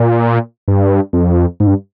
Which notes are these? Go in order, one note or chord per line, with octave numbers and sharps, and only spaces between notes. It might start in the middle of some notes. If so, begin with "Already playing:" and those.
Already playing: A#2
G2
F2
G#2
G2